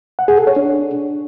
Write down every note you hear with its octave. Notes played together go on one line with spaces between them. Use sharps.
F#5
G#4
A4
C#5
D4